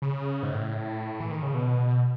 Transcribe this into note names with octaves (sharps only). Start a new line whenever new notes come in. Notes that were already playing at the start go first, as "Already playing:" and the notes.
C#3
G#2
A2
E3
D#3
C#3
B2